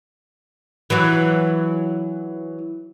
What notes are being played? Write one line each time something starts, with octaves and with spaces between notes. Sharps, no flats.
E3 F#3